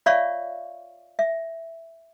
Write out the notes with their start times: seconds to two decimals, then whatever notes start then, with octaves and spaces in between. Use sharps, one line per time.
0.06 F4 C#5 D5 E5 F5 C#6
1.19 E5